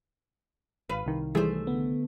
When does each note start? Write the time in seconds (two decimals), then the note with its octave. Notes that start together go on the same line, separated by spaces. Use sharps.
0.89 G#1 B4 F5
1.06 C2 D#3
1.35 E3 G3 A3 G#4 C5
1.67 D3 B3